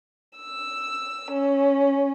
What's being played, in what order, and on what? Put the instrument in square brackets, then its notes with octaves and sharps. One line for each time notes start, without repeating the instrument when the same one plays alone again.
[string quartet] E6
C#4